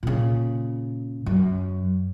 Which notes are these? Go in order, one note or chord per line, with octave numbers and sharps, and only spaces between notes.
A#2 C#3
F#2